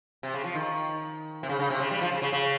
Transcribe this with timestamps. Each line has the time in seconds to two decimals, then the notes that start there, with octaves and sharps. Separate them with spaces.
0.23 C3
0.34 C#3
0.44 F3
0.55 D#3
1.43 C3
1.49 C#3
1.59 C#3
1.70 C3
1.80 C#3
1.91 G3
2.01 F3
2.11 C#3
2.22 C#3
2.33 C#3